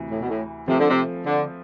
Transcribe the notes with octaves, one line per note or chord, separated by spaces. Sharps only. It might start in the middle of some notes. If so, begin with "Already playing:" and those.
Already playing: D2 C3 E3
A2
B2
A2
C3 F3 A3 C4
D3
C3
D3